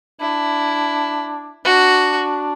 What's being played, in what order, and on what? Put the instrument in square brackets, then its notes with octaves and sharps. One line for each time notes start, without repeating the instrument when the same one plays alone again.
[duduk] D4 [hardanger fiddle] E4
[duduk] D4 [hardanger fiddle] F#4